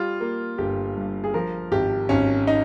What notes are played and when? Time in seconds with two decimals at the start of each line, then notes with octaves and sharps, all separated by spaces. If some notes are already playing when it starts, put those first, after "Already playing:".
Already playing: G3 F4
0.21 A#3
0.58 G1 G4
0.96 G2
1.24 G#4
1.34 F3 A#4
1.72 G#1 G4
2.09 G#1 C#4
2.47 D#4